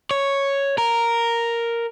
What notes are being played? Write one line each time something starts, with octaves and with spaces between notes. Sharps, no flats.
C#5
A#4